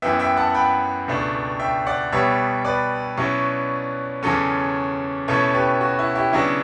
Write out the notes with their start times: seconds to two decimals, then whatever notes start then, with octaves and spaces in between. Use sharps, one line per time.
0.02 F#2 E3 B3 E5 G5
0.20 E5 G5
0.37 F#5 A5
0.54 G5 B5
1.08 C#2 B2 A3 D4
1.60 E5 G5
1.86 D5 F#5
2.12 B2 G3 B3 C#5 E5
2.65 B4 D5
3.17 B2 F#3 C#4 E4
4.23 E2 C#3 F#3 C#4 A4 C#5
5.28 B2 A3 C#4 E4 A4 C#5
5.54 G4 B4
5.81 F#4
5.99 E4
6.15 E4 G4
6.33 C#3 F#3 B3 D4 E4